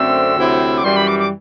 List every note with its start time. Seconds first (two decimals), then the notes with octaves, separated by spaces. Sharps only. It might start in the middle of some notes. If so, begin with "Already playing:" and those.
Already playing: F#2 D3 A3 C4 E6
0.36 D2 C3 F#3 C4 E4
0.78 D6
0.83 F#2 E3 G3 C6
0.96 B5
1.08 D6
1.19 D6